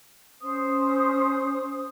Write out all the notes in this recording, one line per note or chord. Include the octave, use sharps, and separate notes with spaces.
C#4 C5 D#6